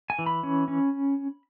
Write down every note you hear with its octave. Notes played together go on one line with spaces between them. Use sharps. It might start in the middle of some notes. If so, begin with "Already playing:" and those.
G#5
E3
B5
C#4
C#4